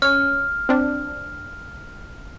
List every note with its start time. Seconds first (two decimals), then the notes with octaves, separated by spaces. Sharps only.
0.02 C#4 C#5 F6
0.69 C4 D4